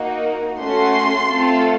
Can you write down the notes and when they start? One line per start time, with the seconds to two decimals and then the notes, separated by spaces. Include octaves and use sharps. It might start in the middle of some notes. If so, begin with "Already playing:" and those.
Already playing: A#3 D#4 F#4
0.59 A3 C#4 F#4 C6
1.29 A3 C4 F4 A4